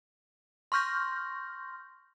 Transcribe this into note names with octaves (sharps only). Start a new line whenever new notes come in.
C6 C#6 F6 G6 A#6